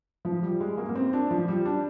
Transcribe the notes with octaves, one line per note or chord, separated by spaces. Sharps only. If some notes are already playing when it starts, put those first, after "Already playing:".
F3
G3
G#3
A#3
A#3
C4
D4
F3
G3
D4